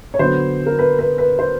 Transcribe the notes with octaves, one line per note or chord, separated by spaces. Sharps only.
C#5
D3 F#3 B3 C5
A#4
B4
B4
B4
C5